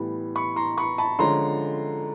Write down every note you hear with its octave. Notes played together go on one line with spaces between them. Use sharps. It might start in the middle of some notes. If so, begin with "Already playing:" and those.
Already playing: A2 E3 G3 B3
B5 C#6
A#5 C6
B5 C#6
A5 B5
D3 F3 G#3 C#4 A#5 C6